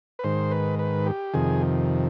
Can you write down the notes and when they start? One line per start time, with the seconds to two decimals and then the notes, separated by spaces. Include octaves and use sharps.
0.19 B4
0.24 G#2 D#3 C5
0.51 B4
0.79 B4
1.06 G4
1.34 F2 C3 D#3 G#4